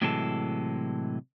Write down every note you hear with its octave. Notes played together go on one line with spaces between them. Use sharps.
A2 C3 E3 F#3 G#3 A4